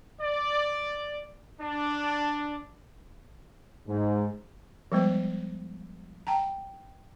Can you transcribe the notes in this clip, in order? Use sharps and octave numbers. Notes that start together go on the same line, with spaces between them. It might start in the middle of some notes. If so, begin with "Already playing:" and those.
D5
D4
G#2
F3 G3 G#3 B3 C5
G5 A5 A#5